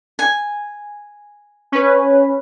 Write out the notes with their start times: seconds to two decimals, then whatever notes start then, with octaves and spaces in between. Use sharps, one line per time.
0.19 G#5
1.72 C#4 B4